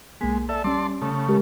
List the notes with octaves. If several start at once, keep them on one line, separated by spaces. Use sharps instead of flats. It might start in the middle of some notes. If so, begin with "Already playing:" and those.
B1 G#3 A#3 B6
A4 D5 E5
G3 C#4 D5 A5 C6
C#3 A3 D#6
G#3 G4 A#4